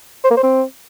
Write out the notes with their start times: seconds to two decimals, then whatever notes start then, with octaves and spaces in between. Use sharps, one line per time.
0.24 C5
0.31 A#3
0.37 C5
0.43 C4